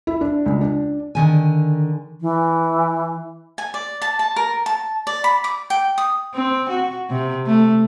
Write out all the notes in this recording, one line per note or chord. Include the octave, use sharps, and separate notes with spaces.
E4
D4
C#2
D4
D3 D#3 G#5
E3
G#5
D5
A5
A5
A#4
A5
D5
B5
D6
G5
D#6
C4
F#4
C3
A3